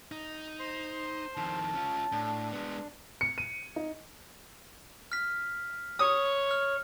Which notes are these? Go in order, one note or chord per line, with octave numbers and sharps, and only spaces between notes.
D#4
C5 C6
F2 D#3 A5
C#4 F4
A2 D4
G#3 B3
C#7
D#7
D#4
F6 B6
C#5 D#6
F6